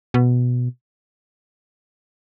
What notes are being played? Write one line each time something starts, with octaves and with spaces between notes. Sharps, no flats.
B2